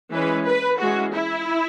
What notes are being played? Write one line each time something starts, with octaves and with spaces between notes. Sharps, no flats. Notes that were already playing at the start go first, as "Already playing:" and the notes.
E3 G#3 C#4 B4
B4
E3 G#3 C#4 F#4
E4